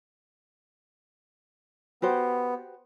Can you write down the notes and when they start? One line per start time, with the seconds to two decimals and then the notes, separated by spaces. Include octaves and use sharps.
2.02 B3 F#4 G4 C5